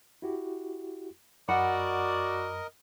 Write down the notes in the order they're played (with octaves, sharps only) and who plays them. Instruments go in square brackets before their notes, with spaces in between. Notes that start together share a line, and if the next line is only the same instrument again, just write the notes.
[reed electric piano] E4 F#4 G4
[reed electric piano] F#2 B5 [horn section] F#4 D5 [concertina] A#4 D#5 [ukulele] F#5